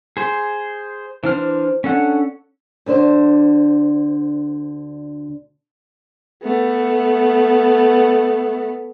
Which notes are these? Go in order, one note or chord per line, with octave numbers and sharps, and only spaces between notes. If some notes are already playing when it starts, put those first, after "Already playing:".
G#4 C5
E3 D4 C5 F6
C#4 D4 A4 F#5
D2 D3 D4 C5
A3 B3